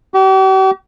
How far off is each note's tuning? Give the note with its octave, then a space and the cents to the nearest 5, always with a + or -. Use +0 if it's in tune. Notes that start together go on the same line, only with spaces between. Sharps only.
G4 -45